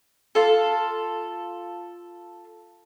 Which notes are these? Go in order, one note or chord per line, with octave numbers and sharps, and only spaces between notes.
F4 A4